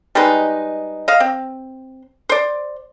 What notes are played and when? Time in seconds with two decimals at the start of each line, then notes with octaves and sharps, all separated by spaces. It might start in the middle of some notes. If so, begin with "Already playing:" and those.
0.15 G3 G#3 D#4 B4
1.08 D#5 F5
1.20 C4
2.29 C5 D5